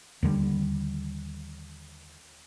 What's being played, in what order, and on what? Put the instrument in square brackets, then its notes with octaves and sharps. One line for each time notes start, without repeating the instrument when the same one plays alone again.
[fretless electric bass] D#2 D3 G3